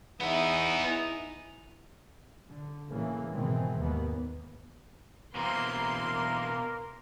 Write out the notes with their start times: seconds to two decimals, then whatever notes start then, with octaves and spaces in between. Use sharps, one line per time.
0.21 E2 B3 D#4 E4 E5 F#5
0.87 E4 G#5 F7
2.47 D3
2.89 A2 C#3 E3 A#3
3.32 G#2 B2 D#3 E3 G#3 C4
3.77 D#2 G#2 A#3 B3
5.35 B2 E3 A#3 C4 A#4 C6